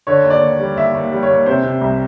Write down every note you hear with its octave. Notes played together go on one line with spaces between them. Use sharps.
D3 C#5
D#2
D5
D#2
G3
D#2 E5
D#2
G3
C#5
D#2
C3 C5
C3
C2